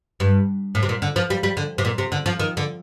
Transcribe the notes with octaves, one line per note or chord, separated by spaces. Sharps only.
G2
A2
C3
A#2
D3
F3
G3
G3
D3
C3
A#2
C3
D3
F3
D#3
D3